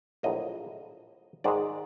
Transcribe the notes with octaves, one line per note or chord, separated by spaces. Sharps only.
A#1 A2 F#3 A#3 D#5
G#2 D#3 G#3 D5